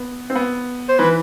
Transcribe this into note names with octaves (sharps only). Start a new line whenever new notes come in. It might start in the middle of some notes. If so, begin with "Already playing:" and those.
Already playing: B3
C4
B3
C5
E3 B4